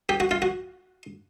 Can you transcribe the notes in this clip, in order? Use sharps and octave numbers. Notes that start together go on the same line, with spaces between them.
G4
F#4
F4
F#4